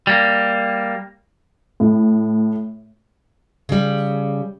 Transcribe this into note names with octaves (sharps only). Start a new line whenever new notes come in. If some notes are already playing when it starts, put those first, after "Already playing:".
G3 A#3
A2
C#3 G3